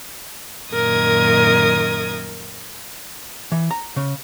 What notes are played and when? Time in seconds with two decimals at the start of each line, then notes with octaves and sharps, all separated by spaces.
0.72 F#2 A#2 D#3 A#4 D#6 G#6
3.52 E3
3.71 A#5
3.96 C#3